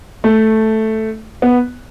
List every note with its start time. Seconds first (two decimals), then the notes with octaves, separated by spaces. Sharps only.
0.24 A3
1.42 B3